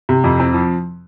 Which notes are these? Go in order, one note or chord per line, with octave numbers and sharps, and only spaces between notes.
C3
F2
C4
F3